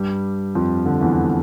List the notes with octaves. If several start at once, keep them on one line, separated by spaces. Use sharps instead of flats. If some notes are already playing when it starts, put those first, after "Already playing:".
Already playing: G2 G3
F2 F3
D3
E2 E3